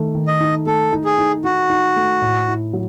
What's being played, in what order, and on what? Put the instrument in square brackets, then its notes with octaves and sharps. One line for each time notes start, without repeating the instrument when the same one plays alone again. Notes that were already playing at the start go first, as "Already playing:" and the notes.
Already playing: [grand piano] D#3 A3
D#3
[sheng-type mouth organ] D#5
[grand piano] D#4
[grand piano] A3 [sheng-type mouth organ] A4
[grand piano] D#4
[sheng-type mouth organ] G#4
[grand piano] D#4
[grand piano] D#4 [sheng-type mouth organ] F#4
[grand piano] D#4
A3
A2
E4
F#3